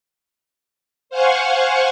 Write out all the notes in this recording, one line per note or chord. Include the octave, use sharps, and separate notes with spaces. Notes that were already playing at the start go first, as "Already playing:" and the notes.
C5 F5 F#5 G#5 C#6